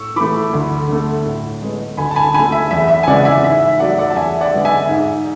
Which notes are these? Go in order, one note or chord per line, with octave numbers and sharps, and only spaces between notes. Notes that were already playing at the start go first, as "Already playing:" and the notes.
Already playing: A2 C#6 E6
E3 A3 B5 D6
D2
D3 A3
A2
G#3 B3
D2 G#5 B5
A5
G#5 B5
D3 A3 G#5 B5
E5
E2 E5
E5
G#5
C#3 E3 G#3 B3 D5 F#5
E5 G#5
G#2 E5
E5
F#3 A3 D5 F#5
D5 F#5
A5
E2 E5 G#5
D5 F#5
D3 G#3 B3
E5 G#5
G#2